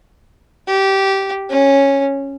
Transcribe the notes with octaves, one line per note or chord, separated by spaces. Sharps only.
G4
C#4